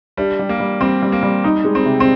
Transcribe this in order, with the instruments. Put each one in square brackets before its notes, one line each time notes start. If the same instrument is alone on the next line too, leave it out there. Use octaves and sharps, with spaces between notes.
[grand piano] G3 [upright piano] D4
[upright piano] G3
[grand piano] A#3
[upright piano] G3
[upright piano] G3 [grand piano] C4
[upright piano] G3
[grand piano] A#3
[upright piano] G3
D#4
G#3
[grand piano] C4
[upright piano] C3
[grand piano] C4